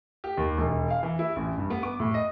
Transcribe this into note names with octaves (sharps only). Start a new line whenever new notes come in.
G4
D#2
E1
F5
E3
E4
A1
G2
B3
D6
A2
D#5